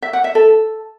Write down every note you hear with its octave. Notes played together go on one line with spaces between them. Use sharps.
E5
F#5
E5
A4